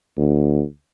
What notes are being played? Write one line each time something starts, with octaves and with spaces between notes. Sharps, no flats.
D2